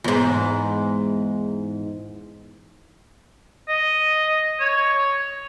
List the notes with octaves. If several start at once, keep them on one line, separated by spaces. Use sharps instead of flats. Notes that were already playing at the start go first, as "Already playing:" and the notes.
E2 G#2
D#5
C#5